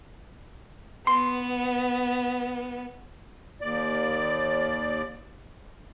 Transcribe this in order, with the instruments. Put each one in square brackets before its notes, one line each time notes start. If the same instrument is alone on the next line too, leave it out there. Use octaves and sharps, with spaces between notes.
[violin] B3 [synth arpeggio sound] C6
[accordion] D#2 D5